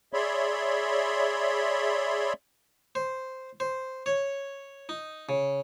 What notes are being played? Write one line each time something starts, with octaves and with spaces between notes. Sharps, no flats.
G#4 C#5 D5 E5 B5 C6
C5
C5
C#5
D#4
C#3